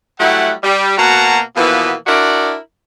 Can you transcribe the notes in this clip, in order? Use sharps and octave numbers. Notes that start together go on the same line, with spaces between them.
F#3 G3 A3 E4 F#5
G3
B2 A#3 F#4 F#5 A5 A#5
B2 E3 F3 A#3 B3
D4 E4 F#4 A#4 D5